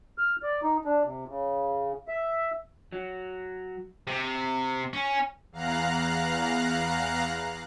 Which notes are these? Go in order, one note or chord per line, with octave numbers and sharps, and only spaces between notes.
F6
D5
D#4
D4
C3
C#3
E5
F#3
C3
C#4
E2 F5 A#5 F#6